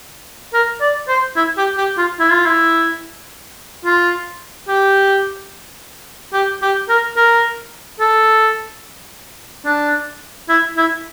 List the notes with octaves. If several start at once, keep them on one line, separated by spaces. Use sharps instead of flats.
A#4
D5
C5
E4
G4
G4
F4
E4
F4
E4
F4
G4
G4
G4
A#4
A#4
A4
D4
E4
E4